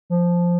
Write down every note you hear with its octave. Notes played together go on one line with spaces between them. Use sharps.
F3